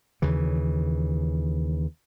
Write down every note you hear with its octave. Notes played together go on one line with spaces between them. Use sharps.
D#2 C#3 E3